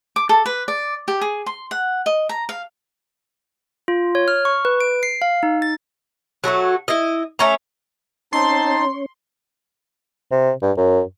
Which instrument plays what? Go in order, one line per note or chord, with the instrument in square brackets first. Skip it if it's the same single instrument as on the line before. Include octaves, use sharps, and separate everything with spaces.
[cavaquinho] D6
A4
B4
D5
G4
G#4
C6
F#5
D#5
A#5
F5
[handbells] F4
C#5
F6
C#6
B4
D7
C7
F5
D#4
A6
[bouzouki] F#3 A3 E4 F#4
E4 D#5
A3 C#4 A#5
[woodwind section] C4 A5 [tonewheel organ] C#4 C#5 [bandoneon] D#4 [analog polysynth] C6
[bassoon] C3
G2
F#2